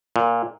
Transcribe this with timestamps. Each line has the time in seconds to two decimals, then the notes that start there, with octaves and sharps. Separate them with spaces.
0.16 A#2